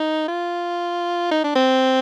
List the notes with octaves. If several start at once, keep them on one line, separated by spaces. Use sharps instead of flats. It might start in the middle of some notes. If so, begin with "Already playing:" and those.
Already playing: D#4
F4
D#4
D4
C4